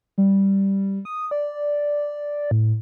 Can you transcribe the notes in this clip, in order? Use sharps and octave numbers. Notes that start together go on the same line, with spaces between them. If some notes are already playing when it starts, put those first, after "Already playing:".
G3
D#6
D5
A2